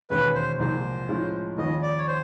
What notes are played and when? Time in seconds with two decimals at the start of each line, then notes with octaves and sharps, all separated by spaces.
0.10 E1 D#2 D#3 G#3 C#4 B4
0.35 C5
0.59 C2 A#2 F3 G#3 C5
1.08 A2 F3 G#3 C#4 F4
1.58 D#2 C#3 F3 D#5
1.82 D5
1.98 C#5
2.07 C5